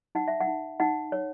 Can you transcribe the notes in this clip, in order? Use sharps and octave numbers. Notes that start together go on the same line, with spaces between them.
D#4 F#5
E5
F#5
D#4
D#4 F#5
C#5